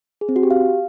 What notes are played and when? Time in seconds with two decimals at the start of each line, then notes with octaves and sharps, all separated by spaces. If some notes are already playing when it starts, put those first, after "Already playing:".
0.21 G#4
0.29 C4
0.36 F#4
0.43 G4
0.51 F5